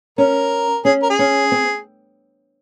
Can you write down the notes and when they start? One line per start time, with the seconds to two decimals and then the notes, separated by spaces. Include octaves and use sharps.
0.18 C#4 A#4
0.85 C#4 G#4
1.02 A#4
1.10 G#4
1.19 C#4
1.52 C4